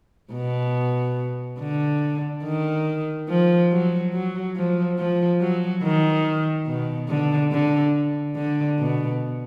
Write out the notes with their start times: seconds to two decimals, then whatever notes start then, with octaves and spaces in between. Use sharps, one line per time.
0.33 B2
1.60 D3
2.44 D#3
3.29 F3
3.72 F#3
4.13 F#3
4.56 F3
4.98 F3
5.41 F#3
5.83 D#3
6.67 B2
7.09 D3
7.52 D3
8.36 D3
8.79 B2